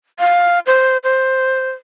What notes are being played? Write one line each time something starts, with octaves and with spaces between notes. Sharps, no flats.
F5
C5
C5